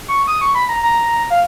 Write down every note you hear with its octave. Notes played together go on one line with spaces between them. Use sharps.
C#6
D#6
C#6
B5
A#5
A#5
F5